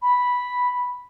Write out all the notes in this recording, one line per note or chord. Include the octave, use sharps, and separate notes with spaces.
B5